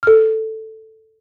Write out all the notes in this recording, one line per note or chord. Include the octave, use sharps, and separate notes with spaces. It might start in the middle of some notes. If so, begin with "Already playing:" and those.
A4 F6